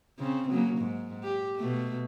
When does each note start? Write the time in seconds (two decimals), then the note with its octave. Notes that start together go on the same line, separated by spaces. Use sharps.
0.19 C#3 C4
0.49 C#3 F#3 A#3
0.78 G#2
1.23 G4
1.56 B2 A3